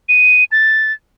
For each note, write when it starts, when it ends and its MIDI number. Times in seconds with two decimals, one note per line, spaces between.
0.09 0.44 99
0.52 0.92 93